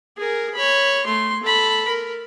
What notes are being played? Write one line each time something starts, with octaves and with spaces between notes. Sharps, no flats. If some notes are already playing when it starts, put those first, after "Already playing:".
G#4 A#4
C#5 B5
A3 C6
A4 B5
A#4